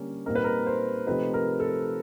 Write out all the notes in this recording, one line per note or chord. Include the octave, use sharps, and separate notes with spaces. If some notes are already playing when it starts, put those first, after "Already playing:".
Already playing: D3 G3 A#3 C#4
A#2 G3 C4 D#4 A#4
B4
A#4
C5
C3 F3 A3 C4 D#4 B4
A#4
A4